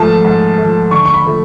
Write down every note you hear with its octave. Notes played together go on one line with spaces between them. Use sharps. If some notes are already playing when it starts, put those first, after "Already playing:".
Already playing: G#2 F3 A3 A5
G#2
F3 A3
D3 C#6
C#6
B5
F3 A3